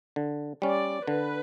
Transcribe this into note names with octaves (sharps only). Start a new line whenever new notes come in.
D3
G3 C#4 D5
D3 B4